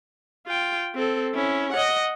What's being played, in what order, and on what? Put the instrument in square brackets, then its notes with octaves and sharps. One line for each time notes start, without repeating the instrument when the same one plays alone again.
[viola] F4 G5
C4 A4
C#4 E4
D#5 F#5